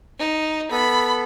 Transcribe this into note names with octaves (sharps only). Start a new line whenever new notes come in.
D#4
B3 A4 B5